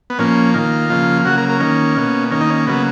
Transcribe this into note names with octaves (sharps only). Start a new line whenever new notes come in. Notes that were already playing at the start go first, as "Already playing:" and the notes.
B3
A#2 F3 A#3 C#4
D#3 A#3 F4
C#3 F3 A#3
C#3 F#3 A#3 F#4
A#4
A#4
D#3 A#3 C#4
B2 A#3
D#3 A#3 C#4
D#4
C#4
C#3 F#3 A#3 B3